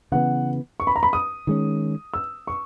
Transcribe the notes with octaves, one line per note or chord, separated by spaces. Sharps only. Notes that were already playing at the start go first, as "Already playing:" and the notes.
C#3 E3 B3 F#5
C#6
B5
A#5
B5
D#6
D#3 G#3 C#4
E6
C#6